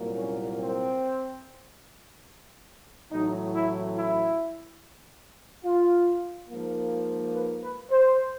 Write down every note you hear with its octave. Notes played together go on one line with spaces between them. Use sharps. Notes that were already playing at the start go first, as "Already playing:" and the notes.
Already playing: C2 A#2 F#3 A#3
C#4
C4
A1 A2 F#3 D#4
E4
E4
F4
G#2 F3 A#3
B4
B4
C5